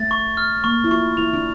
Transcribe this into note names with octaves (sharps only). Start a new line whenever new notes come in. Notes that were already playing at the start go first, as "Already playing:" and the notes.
Already playing: A3 A6
C#6
F6
A#3 C#6
E4
F4 C#6
E4 F7
D4